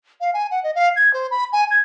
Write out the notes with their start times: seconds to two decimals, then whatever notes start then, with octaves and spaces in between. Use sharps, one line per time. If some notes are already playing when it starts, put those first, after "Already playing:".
0.21 F5
0.34 G#5
0.51 F#5
0.63 D#5
0.75 F5
0.96 G#6
1.13 C5
1.31 B5
1.52 G#5
1.70 G#6